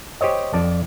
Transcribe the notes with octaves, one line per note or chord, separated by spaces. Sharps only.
G4 C5 C#5 D#5
F2 D5 A5